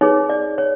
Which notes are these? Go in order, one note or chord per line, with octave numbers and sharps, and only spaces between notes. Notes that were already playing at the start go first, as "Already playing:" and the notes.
D#4 G#4 B4 C#5
D5
C#5